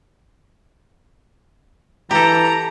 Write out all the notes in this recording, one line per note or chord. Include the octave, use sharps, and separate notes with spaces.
E3 G4 A4 A#5